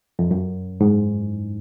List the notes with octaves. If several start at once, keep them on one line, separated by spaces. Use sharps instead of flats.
F2
F#2
G#2